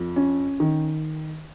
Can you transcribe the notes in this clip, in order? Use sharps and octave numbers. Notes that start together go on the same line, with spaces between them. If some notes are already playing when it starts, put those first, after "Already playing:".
Already playing: F2
C#4
D#3